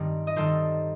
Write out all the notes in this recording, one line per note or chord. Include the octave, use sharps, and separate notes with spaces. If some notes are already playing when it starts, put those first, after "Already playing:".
Already playing: G2 D#3 G3 C4 D#4
D#5
G2 D#3 G3 C4 D#4 A4 C5